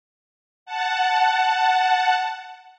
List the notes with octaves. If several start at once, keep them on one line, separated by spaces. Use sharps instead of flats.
F#5 A5